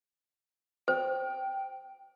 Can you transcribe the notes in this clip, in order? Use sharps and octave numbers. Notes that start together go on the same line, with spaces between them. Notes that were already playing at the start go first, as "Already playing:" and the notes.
C5 G5